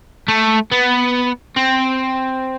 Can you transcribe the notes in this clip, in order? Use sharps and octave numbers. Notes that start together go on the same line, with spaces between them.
A3
B3
C4